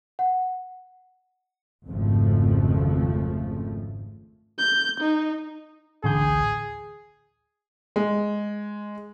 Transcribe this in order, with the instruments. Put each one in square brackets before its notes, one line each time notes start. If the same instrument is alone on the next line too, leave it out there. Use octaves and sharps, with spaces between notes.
[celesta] F#5
[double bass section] G#1 F2 C#3 F3 A3
[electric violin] G6
D#4
[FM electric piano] A1 D2 G6 [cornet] G#4
[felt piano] G#3